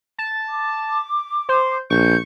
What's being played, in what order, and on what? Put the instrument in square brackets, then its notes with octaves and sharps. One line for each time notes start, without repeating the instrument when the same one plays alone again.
[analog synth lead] A5
[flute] D6
[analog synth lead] C5
[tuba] A#1 [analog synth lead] C#6 [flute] G6